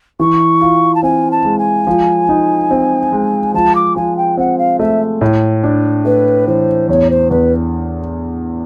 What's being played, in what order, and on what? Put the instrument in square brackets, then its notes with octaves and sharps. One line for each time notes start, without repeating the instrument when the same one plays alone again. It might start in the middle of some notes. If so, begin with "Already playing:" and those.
[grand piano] E3 [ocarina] C#6
[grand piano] F4
[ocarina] A5
[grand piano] C4 [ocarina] G#5
[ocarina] A5
[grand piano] G#3
[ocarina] G#5
[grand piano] F3
D#4
C4
G#3
[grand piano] F3 [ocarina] A5
[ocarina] D6
[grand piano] F3 [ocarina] G#5
[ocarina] G5
[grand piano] C4 [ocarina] F#5
[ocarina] F5
[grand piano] A3 [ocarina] E5
[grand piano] A2
D4
[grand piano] A3 [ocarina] B4
[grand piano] E3 [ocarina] C5
[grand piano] E2 [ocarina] C#5
[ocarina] C5
[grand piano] E2 [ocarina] B4